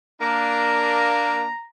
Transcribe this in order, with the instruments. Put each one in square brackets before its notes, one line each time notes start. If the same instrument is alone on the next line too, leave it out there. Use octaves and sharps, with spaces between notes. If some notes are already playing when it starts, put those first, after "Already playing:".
[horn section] A#3 D4 [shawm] A#5